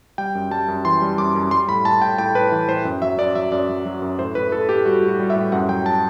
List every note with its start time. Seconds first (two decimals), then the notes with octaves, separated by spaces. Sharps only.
0.18 G3 G5
0.35 F#2
0.51 G3 A5
0.68 F#2
0.85 E3 C6
1.02 G3
1.18 F#2 D6
1.35 F#2
1.51 G3 C6
1.68 A2 B5
1.85 A2 A5
2.02 A2 G5
2.18 A2 G5
2.35 A2 B4
2.52 E3
2.69 A2 C5
2.85 F#2
3.02 F#3 E5
3.18 F#2 D5
3.35 F#3 E5
3.52 F#2 D5
3.69 F#3
3.85 F#3
4.02 F#2
4.19 A2 C5
4.35 A2 B4
4.52 A2 A4
4.69 A2 G4
4.85 G3 F#4
5.02 A2
5.08 F#4
5.19 G3
5.30 E5
5.36 A2
5.52 F#2 F#5
5.69 F#3 G5
5.86 A5